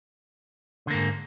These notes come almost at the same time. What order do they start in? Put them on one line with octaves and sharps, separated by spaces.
D3 A#3 G#2